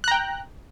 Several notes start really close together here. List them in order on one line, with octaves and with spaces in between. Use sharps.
F#6 A#5 G5